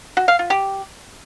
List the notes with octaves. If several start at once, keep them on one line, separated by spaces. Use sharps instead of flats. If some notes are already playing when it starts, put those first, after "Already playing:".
F#4
F5
F4
G4